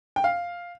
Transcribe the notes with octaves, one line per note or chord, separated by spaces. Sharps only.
G5
F5